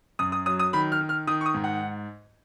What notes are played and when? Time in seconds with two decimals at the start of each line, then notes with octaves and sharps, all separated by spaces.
0.19 F#2 D#6
0.32 D#6
0.46 F#3 D#6
0.59 D#6
0.73 D#3 B5
0.92 F6
1.01 D#3
1.09 F6
1.27 D#3 D#6
1.41 C#6
1.46 D#6
1.54 G#2
1.64 F#5